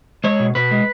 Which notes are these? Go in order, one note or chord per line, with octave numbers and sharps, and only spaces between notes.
G#3 C#5
B2
B2 B4
G#3